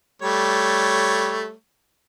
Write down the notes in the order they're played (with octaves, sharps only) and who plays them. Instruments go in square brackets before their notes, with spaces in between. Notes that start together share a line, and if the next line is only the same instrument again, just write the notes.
[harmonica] G3 A3 C#5